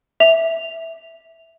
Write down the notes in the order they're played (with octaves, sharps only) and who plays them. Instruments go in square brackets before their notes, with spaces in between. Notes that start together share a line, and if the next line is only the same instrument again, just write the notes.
[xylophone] E5 F7